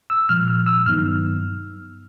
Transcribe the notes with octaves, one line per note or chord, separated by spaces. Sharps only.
E6
A#2 F3 G#3 F6
F6
E6
G2 D#3 F#3 B3 D#4 F6